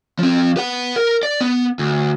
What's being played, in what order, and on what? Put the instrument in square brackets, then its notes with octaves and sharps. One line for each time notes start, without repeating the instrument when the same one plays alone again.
[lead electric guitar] F3 C4
B4 F#5
A#4
D5
B3
D2